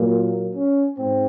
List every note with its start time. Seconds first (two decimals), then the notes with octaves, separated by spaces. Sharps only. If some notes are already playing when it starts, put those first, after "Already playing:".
Already playing: A#2 F#3 A#3
0.52 C#4
0.97 G#2 C4